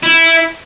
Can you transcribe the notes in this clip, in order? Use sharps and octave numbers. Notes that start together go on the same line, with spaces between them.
E4